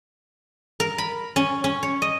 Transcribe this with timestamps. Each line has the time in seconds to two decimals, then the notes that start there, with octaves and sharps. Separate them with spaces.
0.80 A#4
0.98 B5
1.36 C#4
1.64 C#4
1.83 C#5
2.02 D#5